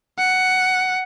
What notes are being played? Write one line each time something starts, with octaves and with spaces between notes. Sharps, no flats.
F#5